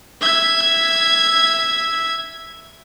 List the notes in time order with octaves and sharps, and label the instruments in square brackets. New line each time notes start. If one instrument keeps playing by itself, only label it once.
[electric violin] E5 G#6